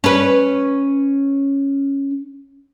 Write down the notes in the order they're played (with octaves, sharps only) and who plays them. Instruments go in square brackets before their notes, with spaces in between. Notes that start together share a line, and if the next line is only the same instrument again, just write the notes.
[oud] C#4 B4